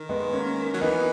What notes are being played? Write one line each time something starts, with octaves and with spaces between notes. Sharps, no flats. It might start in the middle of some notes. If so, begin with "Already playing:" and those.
Already playing: D#3
G#3 B3
A#3 C#4
F#3
E3 B3 D#4